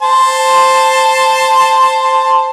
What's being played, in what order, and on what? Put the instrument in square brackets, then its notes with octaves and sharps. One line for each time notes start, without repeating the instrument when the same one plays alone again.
[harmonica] C5 A5